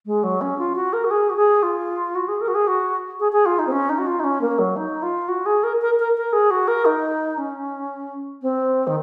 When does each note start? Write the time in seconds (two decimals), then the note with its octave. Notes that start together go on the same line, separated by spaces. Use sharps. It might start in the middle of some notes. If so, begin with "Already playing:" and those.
0.06 G#3
0.23 F#3
0.41 C#4
0.58 F4
0.75 F#4
0.93 A#4
1.04 F#4
1.10 G#4
1.30 F#4
1.36 G#4
1.62 F4
2.15 F#4
2.28 G#4
2.41 A#4
2.47 F#4
2.54 G#4
2.67 F#4
3.19 G#4
3.32 G#4
3.45 F4
3.58 D#4
3.67 C4
3.71 C#4
3.89 D#4
3.98 F#4
4.06 F4
4.19 D#4
4.23 C#4
4.41 A#3
4.58 F#3
4.76 D#4
5.02 F4
5.28 F#4
5.45 G#4
5.63 A#4
5.81 A#4
5.99 A#4
6.17 A#4
6.32 G#4
6.50 F#4
6.67 A#4
6.85 D#4
7.37 C#4
8.42 C4
8.87 D#3